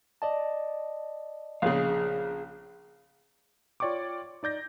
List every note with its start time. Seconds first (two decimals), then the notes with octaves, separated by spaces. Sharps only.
0.22 D5 D#5 A5
1.62 A#1 C#3 G#4 F5
3.80 F4 C#5 D5 G5 C#6 D6
4.43 D#4 D5 G6 A#6